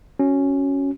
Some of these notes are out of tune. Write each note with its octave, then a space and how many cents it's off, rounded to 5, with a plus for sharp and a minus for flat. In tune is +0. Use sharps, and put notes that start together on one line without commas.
C#4 +0 F#4 +0